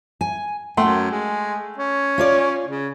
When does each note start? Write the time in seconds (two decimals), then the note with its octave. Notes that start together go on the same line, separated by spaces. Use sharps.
0.21 G#5
0.77 F#2 A3 F#5 G5 C6
1.11 G#3
1.78 C#4
2.18 F4 C#5 D5
2.68 C#3